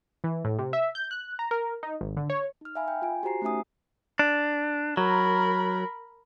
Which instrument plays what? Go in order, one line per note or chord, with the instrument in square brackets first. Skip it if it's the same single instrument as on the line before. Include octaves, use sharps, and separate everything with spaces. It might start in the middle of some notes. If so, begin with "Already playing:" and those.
[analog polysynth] E3
A2
C3
E5
G6
F#6
A#5
A#4
D#4
G#1
D3
C#5
[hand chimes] D#4 F6
E5 F5 G#5 A#5 B5
G5
F4 G#5 D7
F#4 G4 C5 A#5 C7
A3 C#4 D#4 E5 G#5 D#6
[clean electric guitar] D4
[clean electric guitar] F#3 [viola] A#4 B5